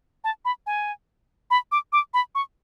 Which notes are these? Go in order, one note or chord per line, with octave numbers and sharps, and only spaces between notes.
A5
B5
G#5
B5
D6
D6
B5
C#6